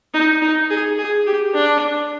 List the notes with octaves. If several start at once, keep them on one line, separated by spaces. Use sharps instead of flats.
D#4
D#4
G#4
G#4
G4
D4